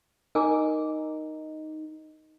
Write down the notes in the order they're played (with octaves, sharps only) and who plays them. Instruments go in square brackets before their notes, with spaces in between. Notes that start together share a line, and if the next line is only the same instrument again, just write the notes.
[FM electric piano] D#4 [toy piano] A#4 G#5 D6